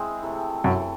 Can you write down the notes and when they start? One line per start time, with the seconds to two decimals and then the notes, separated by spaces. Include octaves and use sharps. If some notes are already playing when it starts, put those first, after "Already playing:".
Already playing: G#3 C4 E4 G#4
0.23 C3 E3 A3
0.64 F#2 C3 E3 A3